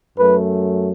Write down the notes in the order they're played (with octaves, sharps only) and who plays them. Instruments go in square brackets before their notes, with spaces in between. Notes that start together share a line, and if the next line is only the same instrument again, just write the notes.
[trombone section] F#2 F#3 A3 B4